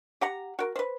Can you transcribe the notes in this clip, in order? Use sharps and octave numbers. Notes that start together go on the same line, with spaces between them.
G4 F#5 A#5
F#4 A#4
B4 C5